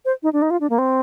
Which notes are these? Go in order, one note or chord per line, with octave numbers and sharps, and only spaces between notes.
C5
D#4
D4
D#4
F4
D4
A#3
C4